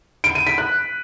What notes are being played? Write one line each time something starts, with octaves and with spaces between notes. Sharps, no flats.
D7
D#7
B6
F#6